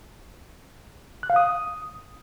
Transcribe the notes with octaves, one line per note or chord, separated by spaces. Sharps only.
F#6
F5
D#6